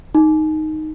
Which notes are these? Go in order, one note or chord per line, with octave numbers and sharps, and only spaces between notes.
D#4